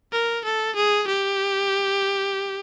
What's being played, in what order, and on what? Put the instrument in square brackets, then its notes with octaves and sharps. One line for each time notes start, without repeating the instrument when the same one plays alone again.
[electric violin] A#4
A4
G#4
G4